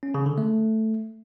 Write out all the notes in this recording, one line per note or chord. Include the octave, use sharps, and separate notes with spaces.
C#4
C#3
D3
A3